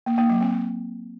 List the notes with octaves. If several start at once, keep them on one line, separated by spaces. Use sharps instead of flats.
A#3
A#3
F#3
C4